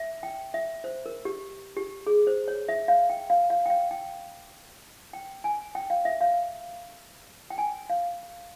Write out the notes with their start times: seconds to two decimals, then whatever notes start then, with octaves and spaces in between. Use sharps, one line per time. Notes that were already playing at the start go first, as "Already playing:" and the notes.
Already playing: E5
0.23 G5
0.54 E5
0.84 C5
1.06 A#4
1.25 G4
1.76 G4
2.07 G#4
2.27 C5
2.48 C#5
2.68 E5
2.88 F5
3.10 G5
3.30 F5
3.50 F5
3.66 G5
3.70 F5
3.91 G5
5.13 G5
5.44 G#5
5.75 G5
5.90 F5
6.05 E5
6.21 F5
7.50 G5
7.58 G#5
7.90 F5